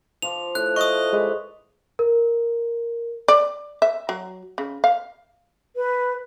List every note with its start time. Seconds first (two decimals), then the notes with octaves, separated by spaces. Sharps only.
0.22 F3 F4 D6 F7
0.55 A2 F#6
0.76 D#5 C#6 D#6
1.13 G#3 B4 D5
1.99 A#4
3.28 D5
3.82 E5
4.09 F#3
4.58 C#3
4.84 F5
5.76 B4